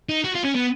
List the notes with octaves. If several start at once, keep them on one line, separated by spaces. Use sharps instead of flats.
D#4
F#4
F4
C#4
B3